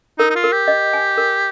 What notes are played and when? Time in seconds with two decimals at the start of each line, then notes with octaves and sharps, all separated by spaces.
0.19 D#4 A#4
0.30 D#4
0.35 F4
0.44 A#4
0.52 G4
0.68 D#5
0.93 G#5
1.17 A#4